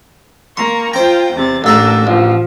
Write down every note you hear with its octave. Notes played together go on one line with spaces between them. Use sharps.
A#3 A#5 C6 C#6
F4 C5 G5 A#5
E2 C3 A6
A1 A3 A#3 D4 A4 A#5
A1 F3